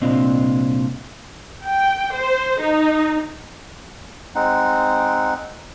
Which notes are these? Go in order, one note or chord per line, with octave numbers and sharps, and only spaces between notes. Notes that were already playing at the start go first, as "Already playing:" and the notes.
C2 A#2 C4 D4 F4 D#5
G5
C5
D#4
G#3 C4 D#4 F#5